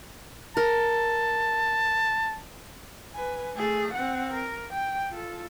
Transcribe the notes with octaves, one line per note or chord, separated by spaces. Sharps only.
A#4 A5
B4 G#5
A3 G#4
C4 F#5
A#4
G5
F4 A4